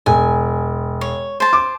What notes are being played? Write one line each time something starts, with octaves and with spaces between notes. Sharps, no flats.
E1 G#5
C#5
C5 A5
D6